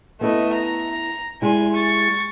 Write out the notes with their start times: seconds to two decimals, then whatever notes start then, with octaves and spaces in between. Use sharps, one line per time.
0.21 A3 B3 E4 B4 D#5
0.53 A#5
1.42 G3 G#3 E4 G#5 C6
1.74 C#6 A6